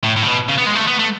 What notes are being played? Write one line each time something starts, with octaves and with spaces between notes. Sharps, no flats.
A2
A2
C#3
B2
C#3
B3
G#3
A3
B3
A3